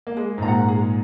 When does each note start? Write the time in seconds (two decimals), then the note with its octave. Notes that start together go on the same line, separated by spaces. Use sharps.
0.07 A#3
0.17 G#3 G#4
0.38 G#2
0.42 A#2 A#5
0.48 F#5
0.68 G#4